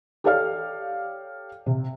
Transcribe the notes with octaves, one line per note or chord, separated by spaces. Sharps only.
G4 A4 C#5 D5 F5 F6
C3